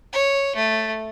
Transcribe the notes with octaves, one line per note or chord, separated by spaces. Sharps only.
C#5
A3